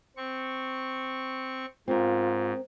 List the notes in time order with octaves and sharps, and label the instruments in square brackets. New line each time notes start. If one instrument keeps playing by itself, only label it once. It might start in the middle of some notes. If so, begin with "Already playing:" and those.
[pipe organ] C4 C#6
[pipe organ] G#2 [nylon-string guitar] C4 A#4 [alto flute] F4